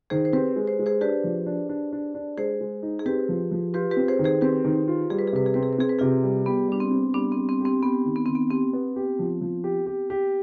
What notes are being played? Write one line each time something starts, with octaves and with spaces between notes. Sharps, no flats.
D#3 G#4 C5
C5
C4 G4 B4
G#3
C5
G#3
G#4 C5
D4 G4 B4
F3
D4
D4
D4
D4
G#3 G#4 C5
G#3
D#4
G#4
C4 G4 B4
F3
F3
F4 G4 B4
G4 B4
C4
G#4 C5
D#3
G#4 C5
C4 G4 B4
D#3
F4
G3 G#4
B4
G#4
C3 B4
G#4
C4 B4
G#4
B4
C4 G#4
B4
C3 F4 G#4
G3
B3 G4
G3 D4
C4
C4
G3 B3 D4
C4
G3
C4
C4 G4
B3 G4
D#3
B3
D#3 C4
B3
C4 G4
B3
G4
F3
F3
G4
G4
G4